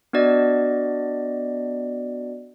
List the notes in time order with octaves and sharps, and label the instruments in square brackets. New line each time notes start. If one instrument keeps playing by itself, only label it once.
[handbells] B3 D4 F#4 D5 D#5